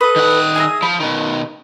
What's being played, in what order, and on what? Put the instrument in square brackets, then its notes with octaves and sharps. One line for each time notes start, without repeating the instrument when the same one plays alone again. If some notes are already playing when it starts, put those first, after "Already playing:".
[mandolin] A4 B4 [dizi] D#6
[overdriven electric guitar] D#3 F#5
[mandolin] G#4 E5 A#5
[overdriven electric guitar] F3 [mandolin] B5
[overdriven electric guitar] B2 D#3